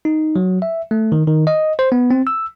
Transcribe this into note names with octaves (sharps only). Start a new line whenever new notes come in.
D#4
F#3
E5
A3
D#3
D#3
D#5
C5
B3
C4
E6